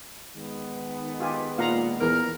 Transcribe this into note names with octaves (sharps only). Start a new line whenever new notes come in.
D#3 G#3 B3
F4 G4 G#5
A#2 F5 F#5 A#5
E2 A#4